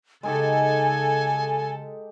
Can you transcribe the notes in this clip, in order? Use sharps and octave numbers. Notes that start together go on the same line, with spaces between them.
C#3 G#3 D#4 G4 A4 G#5